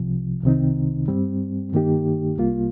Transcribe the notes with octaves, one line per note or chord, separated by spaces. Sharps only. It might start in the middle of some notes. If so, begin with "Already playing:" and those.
Already playing: C2 C3 F3
C2 C3 D#3 C4 D#4
G2 G3 C4
G2 D#3 A#3 D#4 G4
C2 C3 G3 A#3 F4